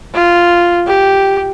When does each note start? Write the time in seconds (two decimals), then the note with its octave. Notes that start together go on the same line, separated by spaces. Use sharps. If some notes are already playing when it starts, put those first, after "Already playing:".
0.14 F4
0.87 G4